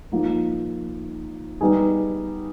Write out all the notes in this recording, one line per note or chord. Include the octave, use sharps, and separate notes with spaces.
F3 A#3 D#4
G3 B3 D#4 G#4